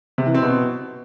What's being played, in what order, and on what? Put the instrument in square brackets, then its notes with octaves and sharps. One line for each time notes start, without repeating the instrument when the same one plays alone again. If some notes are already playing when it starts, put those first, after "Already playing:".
[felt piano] C3
E3
C4
B2